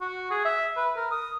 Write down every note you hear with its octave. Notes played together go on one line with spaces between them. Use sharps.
F#4
G#4
E5
B4
A#4
D#6